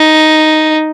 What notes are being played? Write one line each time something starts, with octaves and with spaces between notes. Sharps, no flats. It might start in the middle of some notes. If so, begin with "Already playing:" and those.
Already playing: D#4